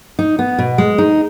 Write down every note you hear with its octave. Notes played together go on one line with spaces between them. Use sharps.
D#4
B3
B2
G#3
D#4